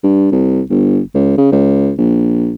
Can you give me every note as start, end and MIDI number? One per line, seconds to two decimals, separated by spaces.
0.03 0.30 43
0.32 0.61 36
0.70 1.00 31
1.14 1.36 37
1.38 1.50 49
1.52 1.93 37
1.98 2.55 34